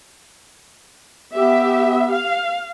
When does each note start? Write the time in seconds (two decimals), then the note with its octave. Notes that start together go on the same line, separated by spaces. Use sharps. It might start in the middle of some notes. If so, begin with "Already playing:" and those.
1.34 B3 G4 E5
2.11 F5